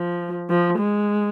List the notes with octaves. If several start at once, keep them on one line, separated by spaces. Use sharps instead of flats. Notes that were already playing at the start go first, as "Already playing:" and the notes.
Already playing: F3
F3
G#3